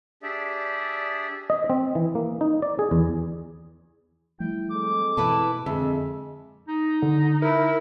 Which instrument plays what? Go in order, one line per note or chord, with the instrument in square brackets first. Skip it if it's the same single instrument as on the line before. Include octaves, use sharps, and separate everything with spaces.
[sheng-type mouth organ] D4 G4 G#4 D5 E5
[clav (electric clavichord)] D#5
C4
E3
A#3
D#4
D5
G#4
E2
[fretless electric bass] F3 G3 A3 [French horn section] E4 [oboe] G5
[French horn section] G#3 C4 A4 [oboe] D6
[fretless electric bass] B2 E3 [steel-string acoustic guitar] E4 B4 A5
[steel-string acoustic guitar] F2 [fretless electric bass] D3 [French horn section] G#3 [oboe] E5
[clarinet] D#4
[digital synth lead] D3
[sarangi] E4 [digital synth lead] A#4